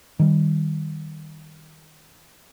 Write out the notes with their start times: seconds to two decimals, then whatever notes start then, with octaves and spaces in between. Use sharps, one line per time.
0.19 D#3 G3